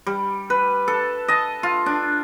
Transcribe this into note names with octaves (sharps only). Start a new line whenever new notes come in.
G3
B4
A4
D#5 A5
F4
D4